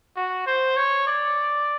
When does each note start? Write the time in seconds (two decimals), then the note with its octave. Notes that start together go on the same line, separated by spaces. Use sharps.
0.16 F#4
0.47 C5
0.76 C#5
1.07 D5